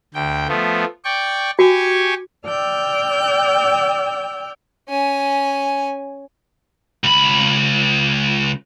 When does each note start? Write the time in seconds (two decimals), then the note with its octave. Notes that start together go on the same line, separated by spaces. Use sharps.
0.14 D2 G5
0.48 F3 A3 B3
1.04 D5 G5 C#6
1.59 F#4 G4 G#5 C#6
2.46 D5 G5 E6 F6 G6
4.89 C#4 G#5
7.04 C#2 B5